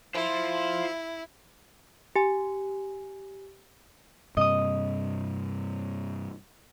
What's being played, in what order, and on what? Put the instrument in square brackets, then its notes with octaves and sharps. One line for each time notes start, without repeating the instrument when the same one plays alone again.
[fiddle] E4 [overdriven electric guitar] F4 C5
[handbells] G4 G#5
[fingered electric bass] G2 C3 [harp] D#5 D#6